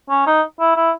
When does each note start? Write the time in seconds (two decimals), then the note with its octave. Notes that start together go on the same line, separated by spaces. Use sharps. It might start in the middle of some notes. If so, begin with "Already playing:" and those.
0.09 C#4
0.27 D#4
0.60 E4
0.76 E4